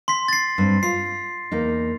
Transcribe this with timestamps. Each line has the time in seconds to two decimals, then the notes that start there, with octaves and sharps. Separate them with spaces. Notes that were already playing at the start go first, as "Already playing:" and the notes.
0.08 C6 B6
0.28 A6 C7
0.58 G2 C4
0.83 F4 C7
1.52 E2 A#3 D#4